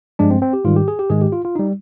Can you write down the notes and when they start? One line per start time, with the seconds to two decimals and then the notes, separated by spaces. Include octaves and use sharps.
0.19 G2 F3 G#3 D4
0.30 C4
0.42 C4
0.53 G4
0.65 G#2 D#3 G3 F4
0.76 G4
0.88 G#4
0.99 G4
1.10 G#2 D#3 G#3 G#4
1.22 G4
1.33 F4
1.45 F4
1.55 G3 D#4